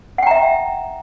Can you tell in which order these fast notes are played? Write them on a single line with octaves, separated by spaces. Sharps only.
F#5 G5 A#5 E5